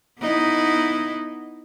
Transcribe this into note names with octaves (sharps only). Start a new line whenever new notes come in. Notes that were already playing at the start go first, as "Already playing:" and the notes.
B3 D#4 E4